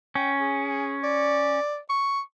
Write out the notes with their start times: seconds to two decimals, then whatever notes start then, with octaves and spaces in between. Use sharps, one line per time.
0.15 C#4 G5
0.40 G#4
1.04 D5
1.90 C#6